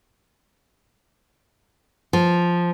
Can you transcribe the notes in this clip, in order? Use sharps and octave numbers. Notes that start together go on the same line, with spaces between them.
F3